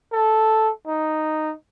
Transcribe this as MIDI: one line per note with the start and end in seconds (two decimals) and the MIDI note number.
0.13 0.71 69
0.87 1.53 63